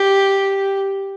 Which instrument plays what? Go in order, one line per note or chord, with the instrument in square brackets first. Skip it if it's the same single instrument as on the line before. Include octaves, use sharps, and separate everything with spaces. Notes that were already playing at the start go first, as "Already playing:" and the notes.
Already playing: [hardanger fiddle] G4